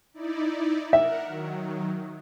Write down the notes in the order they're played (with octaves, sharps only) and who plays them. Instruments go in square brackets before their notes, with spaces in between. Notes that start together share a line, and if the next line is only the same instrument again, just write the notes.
[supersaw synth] D#4 E4 D5
[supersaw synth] A#4 F#5 [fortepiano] E5
[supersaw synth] D#3 F#3